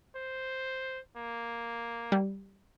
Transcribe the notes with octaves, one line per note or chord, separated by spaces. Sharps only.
C5
A#3
G3